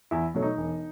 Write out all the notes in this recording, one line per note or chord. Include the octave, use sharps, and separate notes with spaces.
E2 E4
B2 F#3 A3
D#4
E1